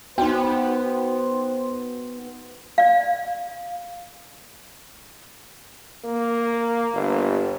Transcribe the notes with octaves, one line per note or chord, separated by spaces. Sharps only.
B3 D#4 F#4 C5 G5
D5 F5
A#3
G1